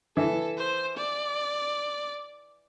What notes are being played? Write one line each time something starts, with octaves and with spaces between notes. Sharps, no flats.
E3 A4
C5
D5